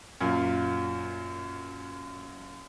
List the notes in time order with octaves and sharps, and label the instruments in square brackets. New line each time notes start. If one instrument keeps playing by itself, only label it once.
[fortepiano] F#2 A#2